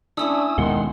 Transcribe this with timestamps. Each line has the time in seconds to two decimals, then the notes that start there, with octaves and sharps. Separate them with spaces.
0.17 A3 C#4 D4 E4 D#6 E6
0.58 D#2 B2 D#3 G#3 F#5 C6